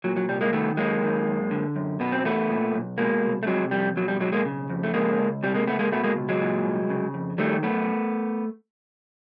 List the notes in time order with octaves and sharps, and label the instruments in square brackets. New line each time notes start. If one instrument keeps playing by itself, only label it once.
[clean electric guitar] A#2 F#3
F#3
C2 G3
G#3 A#3
D#3 A3 B3
F#2 G#3 A#3
D#3
F#2
D3
F#2
B2 B3
C4
E2 A3 B3
A#2
B1
B2 G#3 A#3
C2
A3
C3 F#3 G#3
F2 G3
B2 F#3
G3
B1 F#3 G#3
G#3 A#3
C#3
F2
A3
C#3 G#3 A#3
C#2
C3 G3
G#3 A#3
C#2 A3 B3
G#3 A#3
B2 A3 B3
G#3 A#3
C#2
F#3 G#3
A#2
C2
C#3
F2
D#3 G3 A3
F#2 A3 B3